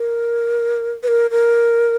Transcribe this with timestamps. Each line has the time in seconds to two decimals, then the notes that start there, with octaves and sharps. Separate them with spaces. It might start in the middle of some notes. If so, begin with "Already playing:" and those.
Already playing: A#4
1.03 B4
1.08 A#4
1.31 A#4